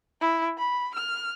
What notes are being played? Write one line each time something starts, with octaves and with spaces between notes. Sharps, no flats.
E4
B5
F6